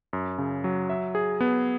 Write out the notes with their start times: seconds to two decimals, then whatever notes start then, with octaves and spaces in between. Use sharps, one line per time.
0.13 F#2
0.38 C#3
0.64 F#3
0.90 E5
1.15 G#4
1.41 B3